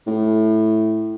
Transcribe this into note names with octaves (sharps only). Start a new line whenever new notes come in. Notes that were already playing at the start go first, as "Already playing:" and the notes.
A2